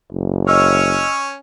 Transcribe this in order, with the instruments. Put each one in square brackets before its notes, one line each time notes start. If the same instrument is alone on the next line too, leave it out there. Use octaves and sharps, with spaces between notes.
[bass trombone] F#1
[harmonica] C#4 C#5 [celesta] D#5 E6 F6